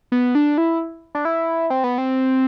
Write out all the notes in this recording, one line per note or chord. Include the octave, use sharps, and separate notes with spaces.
B3
D4
E4
D4
E4
C4
B3
C4